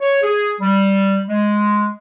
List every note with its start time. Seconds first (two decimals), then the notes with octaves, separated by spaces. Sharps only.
0.01 C#5
0.23 G#4
0.61 G3
1.28 G#3